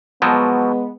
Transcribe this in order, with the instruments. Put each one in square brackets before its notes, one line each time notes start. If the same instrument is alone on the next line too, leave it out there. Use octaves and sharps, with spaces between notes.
[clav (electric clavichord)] B2 F3 F#3 [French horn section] G#3 B3